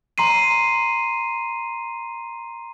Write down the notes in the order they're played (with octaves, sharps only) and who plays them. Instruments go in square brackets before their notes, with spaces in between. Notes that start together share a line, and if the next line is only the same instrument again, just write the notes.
[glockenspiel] A#5 C6 C7 D#7